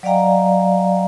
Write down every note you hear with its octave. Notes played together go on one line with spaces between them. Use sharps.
F#3 D5 D#5 F5 G5 A#5